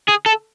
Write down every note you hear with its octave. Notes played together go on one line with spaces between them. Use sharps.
G#4
A4